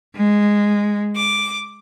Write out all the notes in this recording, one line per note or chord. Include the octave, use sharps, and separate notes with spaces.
G#3
D6